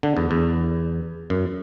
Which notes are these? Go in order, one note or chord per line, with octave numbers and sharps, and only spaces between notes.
D3
E2
E2
F#2